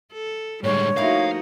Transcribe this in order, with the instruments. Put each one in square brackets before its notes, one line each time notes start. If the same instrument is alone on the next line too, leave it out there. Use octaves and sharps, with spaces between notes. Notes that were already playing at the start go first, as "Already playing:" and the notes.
[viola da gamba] A4
[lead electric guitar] A2 G#3 [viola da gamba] D3 G3 [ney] C#5
[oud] F3 A#3 E4 [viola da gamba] A3 D#4 F#4 [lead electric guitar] F5